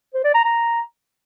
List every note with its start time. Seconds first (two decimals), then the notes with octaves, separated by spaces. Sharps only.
0.14 C5
0.24 D5
0.34 A#5
0.45 A#5